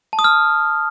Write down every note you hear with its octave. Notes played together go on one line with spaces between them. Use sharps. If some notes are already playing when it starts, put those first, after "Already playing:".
A5
D#6
F6